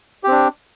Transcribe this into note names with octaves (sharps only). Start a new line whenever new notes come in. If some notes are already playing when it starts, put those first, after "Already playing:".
C4 D4 G4